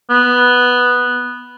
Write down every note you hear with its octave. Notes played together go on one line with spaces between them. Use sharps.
B3